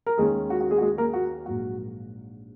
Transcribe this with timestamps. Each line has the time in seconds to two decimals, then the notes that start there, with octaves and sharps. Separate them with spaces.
0.06 A#4
0.18 D#2 D#3 G#3 C#4 G#4
0.50 F#4
0.61 F#4
0.71 G#3 G#4
0.78 F#4
0.81 G#3 G#4
0.98 A#3 A#4
1.13 F#4
1.46 A#1 G#2 F#3 F#4